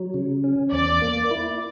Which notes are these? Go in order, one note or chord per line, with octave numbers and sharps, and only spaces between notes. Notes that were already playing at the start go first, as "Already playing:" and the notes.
Already playing: F#3
C#3
C#4
E2 D5
A#3
E4